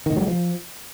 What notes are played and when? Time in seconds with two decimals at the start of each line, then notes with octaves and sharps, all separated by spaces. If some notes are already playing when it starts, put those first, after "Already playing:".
0.06 D#3
0.11 A2
0.17 F#3
0.22 G#3
0.27 F3